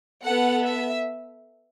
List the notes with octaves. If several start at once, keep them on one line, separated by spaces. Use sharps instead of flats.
B3 A4 F#5
E5